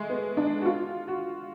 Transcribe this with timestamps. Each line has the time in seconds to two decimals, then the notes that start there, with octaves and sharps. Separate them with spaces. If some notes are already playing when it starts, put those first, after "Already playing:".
Already playing: G#3 A3
0.10 B3
0.37 D4
0.62 F#4
0.65 F4
1.08 F#4